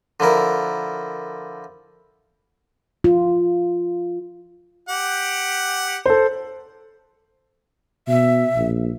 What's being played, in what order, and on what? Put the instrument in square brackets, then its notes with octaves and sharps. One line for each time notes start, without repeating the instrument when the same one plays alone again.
[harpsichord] D3 F3 E4 A#4
[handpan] F4
[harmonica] G4 F#5
[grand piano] A4 C5
[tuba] B2 [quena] E5
[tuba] A#1